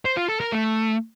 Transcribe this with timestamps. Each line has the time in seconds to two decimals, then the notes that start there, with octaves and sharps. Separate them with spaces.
0.05 C5
0.17 F4
0.29 A4
0.40 A#4
0.52 A3